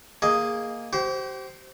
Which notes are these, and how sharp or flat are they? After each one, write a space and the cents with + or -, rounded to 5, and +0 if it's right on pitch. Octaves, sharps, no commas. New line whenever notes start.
A#3 +0 G#4 +0 D#5 +0
G4 -40 C5 +0